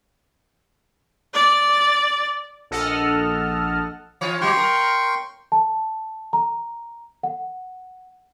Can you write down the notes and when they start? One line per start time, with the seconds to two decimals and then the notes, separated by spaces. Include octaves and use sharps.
1.34 D5
2.71 A#1 A4 D#5 F#5 A5 F6
4.21 E3 F4 C#5
4.41 F#3 F#4 G5 C6 C#6
4.57 A#4
5.52 A5
6.33 A#5
7.23 F#5